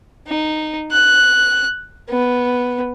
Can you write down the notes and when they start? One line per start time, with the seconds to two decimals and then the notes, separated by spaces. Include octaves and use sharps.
0.27 D#4
0.91 F#6
2.09 B3